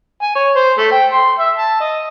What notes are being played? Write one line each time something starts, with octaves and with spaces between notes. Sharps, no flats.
G#5
C#5
C5
A3
G5
C6
E5
A5
D#5